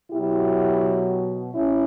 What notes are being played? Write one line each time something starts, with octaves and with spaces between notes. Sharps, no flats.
B2 F#3 E4 G4
A2 C#4 E4